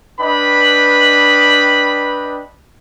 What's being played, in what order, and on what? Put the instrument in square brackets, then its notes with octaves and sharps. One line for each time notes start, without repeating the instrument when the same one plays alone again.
[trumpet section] D4 B4 D#5 G5 B5